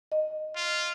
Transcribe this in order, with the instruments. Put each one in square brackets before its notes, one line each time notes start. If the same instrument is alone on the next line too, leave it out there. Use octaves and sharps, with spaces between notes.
[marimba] D#5
[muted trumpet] F4